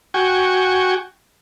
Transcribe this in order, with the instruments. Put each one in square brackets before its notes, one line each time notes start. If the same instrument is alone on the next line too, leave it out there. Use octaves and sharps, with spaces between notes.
[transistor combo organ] F#4 G5 G#5 C#6